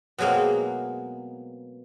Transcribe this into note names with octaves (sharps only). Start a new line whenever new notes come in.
B2 F#3 G#3 A#3 C4